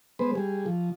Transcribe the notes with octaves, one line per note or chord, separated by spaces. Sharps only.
G#3 B3 B4 C5
G3 G#4
F3